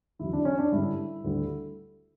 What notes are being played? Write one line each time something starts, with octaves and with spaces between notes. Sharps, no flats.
E2 D3 F#3 E4
D4
C#4
D4
G2 D3 G3 E4
D2 D3 G3